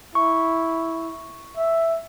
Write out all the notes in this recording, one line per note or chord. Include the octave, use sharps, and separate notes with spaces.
E4 C#6
E5